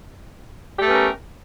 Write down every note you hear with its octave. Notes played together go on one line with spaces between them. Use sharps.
A3 B3 C#4 G4 A#4